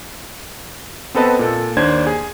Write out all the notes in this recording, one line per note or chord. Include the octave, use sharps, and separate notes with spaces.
B3 C4 A4 B4 D#5 A5
A#2 A4
D#2 D4 C5 G#6
G#4